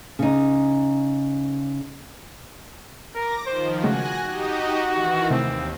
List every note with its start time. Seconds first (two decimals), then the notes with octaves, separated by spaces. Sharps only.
0.19 C#3 D#4
3.15 A#4 D6 A#6
3.46 D#3 F3 C5
3.84 C#3 G#3 A3 F#4 G#5 F#6 A#6
4.25 D#4 G4 D#5
4.89 D#3 E3
5.31 D#2 C3 D#3 A3 C4